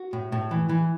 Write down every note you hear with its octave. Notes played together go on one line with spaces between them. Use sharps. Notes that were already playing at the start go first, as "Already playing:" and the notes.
Already playing: F#4
A2
A2
E3
E3